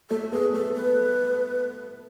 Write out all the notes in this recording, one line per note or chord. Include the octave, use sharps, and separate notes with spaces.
A3 A4
B3 G#4
A3 A4
B4